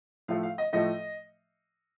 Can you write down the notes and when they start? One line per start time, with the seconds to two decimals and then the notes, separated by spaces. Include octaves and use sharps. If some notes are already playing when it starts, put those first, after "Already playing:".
0.28 A2 F3 A3 F5
0.43 F5
0.58 D#5
0.73 A2 F3 A3 D#5